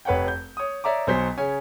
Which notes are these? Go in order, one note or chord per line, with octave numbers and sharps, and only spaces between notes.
F1 B4 C#5 F#5 G5
G6
C#5 D#6
C#5 D5 E5 A#5 D6
B1 F#3 C5 G#5 B6
C#3 C#5 G#5